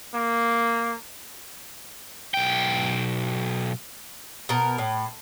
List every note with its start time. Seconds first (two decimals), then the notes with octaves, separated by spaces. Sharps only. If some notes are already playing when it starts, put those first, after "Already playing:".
0.15 A#3
2.34 B1 G5
4.49 B2 A#4
4.78 A2